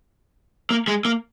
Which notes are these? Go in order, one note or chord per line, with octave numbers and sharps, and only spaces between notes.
A#3
G#3
A#3